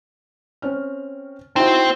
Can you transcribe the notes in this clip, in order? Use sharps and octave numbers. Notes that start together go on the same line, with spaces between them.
C4 C#4 F6
C4 D#4 E4 F#4